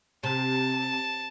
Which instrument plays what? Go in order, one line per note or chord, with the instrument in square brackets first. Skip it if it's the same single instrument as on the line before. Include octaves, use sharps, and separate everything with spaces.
[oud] C3 [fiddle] A5